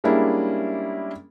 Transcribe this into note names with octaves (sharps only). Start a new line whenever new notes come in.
G3 G#3 A#3 C#4 D4 E4